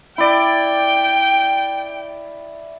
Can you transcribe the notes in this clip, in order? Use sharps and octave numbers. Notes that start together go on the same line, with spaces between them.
E4 D5 G5